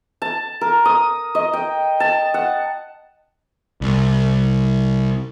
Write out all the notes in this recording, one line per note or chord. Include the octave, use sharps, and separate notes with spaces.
A5
A#4
D#6
D#5
G5
A5
F#5
C2